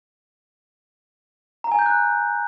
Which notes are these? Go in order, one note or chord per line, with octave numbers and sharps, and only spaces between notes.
A#5
G#5
G6
F#6